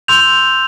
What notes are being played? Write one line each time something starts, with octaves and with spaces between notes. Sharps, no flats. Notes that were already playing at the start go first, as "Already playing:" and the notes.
C6 E6 G6 F7